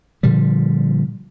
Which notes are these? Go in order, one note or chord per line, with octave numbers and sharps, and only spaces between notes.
A#2 D3 F3 G3